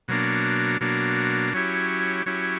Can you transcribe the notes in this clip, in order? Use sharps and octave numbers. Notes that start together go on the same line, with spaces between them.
B2 F#3 A#3 D4
B2 F#3 A#3 D4
F#3 C#4 E4 G4
F#3 C#4 E4 G4